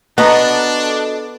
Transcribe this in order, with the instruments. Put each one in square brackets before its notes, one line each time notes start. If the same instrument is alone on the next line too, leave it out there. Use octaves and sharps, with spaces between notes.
[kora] B3 [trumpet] D4 [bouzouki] F#4 A4 D#5 [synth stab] F#5 A#5